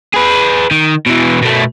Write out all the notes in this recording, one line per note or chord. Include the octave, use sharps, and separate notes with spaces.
G#4 B4
D#3
B2 E3
B2 A3